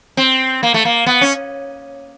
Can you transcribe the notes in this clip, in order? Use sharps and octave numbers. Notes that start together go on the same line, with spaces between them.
C4
A#3
A3
A#3
B3
C#4